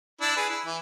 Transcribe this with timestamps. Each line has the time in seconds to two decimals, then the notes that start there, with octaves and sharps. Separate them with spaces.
0.21 D4 E4
0.37 G#4 B4
0.50 E4
0.65 E3